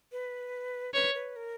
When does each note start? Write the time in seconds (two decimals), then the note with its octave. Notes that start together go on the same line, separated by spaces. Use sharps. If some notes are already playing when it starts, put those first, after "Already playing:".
0.12 B4
0.94 B4 C#5
1.14 B4
1.36 A#4